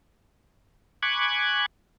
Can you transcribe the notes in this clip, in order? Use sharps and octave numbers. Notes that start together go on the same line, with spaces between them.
G#5 B5 C#6 D6 F#6 G#6